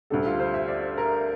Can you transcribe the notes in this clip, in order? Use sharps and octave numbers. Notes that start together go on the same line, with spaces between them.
D2 D3 G3 A4
F4
C5
E5
D5
A#4